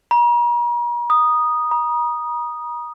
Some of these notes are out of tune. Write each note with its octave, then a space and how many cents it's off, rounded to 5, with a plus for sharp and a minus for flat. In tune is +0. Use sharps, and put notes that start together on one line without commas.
A#5 +45
D#6 -10
A#5 +40